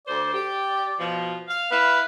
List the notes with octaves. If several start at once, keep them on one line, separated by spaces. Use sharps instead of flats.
D2 C5 D5
G4
B2 F3
F5
E4 B4 F5